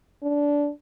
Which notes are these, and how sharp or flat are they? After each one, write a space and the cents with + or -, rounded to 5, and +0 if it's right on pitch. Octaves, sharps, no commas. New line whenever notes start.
D4 -15